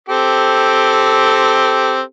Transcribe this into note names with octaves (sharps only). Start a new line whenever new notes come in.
C4 G4 A4